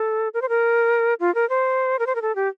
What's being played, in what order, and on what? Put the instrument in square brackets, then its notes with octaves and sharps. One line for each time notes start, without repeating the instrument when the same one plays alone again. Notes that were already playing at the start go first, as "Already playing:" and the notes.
Already playing: [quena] A4
A#4
C5
A#4
F4
A#4
C5
A#4
C5
A#4
A4
G4